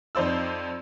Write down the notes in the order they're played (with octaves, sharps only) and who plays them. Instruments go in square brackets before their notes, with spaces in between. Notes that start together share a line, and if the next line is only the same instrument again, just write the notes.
[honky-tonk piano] F2 D#4 C5 D5 E6